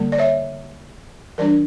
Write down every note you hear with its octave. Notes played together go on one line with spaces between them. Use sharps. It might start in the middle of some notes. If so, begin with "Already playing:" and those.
Already playing: D3 G3 A#3
D5
C#5 E5
E3 G3 D4 A#4 D5